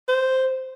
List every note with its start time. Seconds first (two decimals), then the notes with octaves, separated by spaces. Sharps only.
0.09 C5